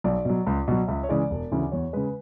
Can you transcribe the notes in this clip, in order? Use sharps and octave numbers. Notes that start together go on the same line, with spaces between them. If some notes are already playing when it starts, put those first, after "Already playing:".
B1 D5
B2 F#3
C#2
B2 F#3
C#2 E5
C#5
C#3 E3 G#3 D5
E1
D2 C#3 E3
E2 C#5
C#3 G#3 B4